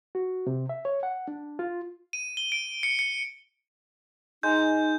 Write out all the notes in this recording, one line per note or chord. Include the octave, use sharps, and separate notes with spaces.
F#4
C3
E5
C#5
F#5
D4
F4
D#7
G7
D7
C#7
C#7
G#3 D#4 A#5 G6